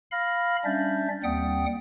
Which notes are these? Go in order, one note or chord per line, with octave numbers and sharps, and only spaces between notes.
F5 B5 F6 A#6
G3 C#4 D4 E5 G6 A6
D#2 G3 C4 F#5 G5 D#6